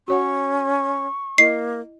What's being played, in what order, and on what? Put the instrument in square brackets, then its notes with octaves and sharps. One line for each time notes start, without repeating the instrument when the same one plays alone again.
[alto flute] C#4 [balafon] F#4 C#5 F#5 [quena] C#6
[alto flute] A#3 [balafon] E4 D#5 [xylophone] C7